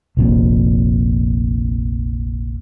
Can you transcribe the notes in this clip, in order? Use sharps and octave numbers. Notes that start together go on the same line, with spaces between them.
F1 A#1 F2